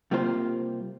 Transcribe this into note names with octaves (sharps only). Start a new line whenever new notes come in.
C3 G3 A#3 F4 C5 G5